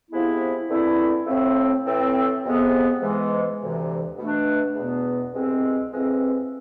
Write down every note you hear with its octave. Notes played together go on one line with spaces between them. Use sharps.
C3 F3 G#3 B3 E4
E2 D3 A3 C4 E4
A2 F3 A3 C4
A2 E3 A3 C4
F2 C3 G#3 B3
G#2 E3 G#3
D2 C3 E3
B2 A3 D4
E2 B2 B3
C2 B2 G#3 C4
F2 E3 G#3 C4